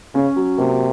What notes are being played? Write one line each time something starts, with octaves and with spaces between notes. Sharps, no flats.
C#3 C#4
F#3
C3 A#3